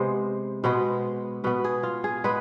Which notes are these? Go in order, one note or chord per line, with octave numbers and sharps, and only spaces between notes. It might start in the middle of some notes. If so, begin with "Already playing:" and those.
Already playing: C3 G#3 B3 C5
B2 G#3 B3 C5
B2 B3 B4
G#4
F4
G#4
G#3 B3 B4